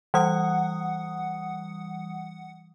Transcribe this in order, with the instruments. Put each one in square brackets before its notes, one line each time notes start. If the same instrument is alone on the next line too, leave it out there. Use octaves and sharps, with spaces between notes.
[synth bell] E3 G3 D#6 [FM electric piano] F#5